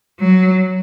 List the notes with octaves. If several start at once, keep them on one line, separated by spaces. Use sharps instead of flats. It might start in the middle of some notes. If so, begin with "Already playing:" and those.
F#3